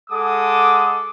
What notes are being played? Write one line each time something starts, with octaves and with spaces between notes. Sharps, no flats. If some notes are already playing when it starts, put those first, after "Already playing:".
G#3 A4 F#5 D6 D#6